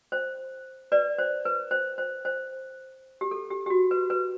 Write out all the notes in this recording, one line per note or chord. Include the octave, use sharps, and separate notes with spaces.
C5
B4 D5
C5
B4
C5
C5
C5
G4
A4
G4
G4
F#4
B4
B4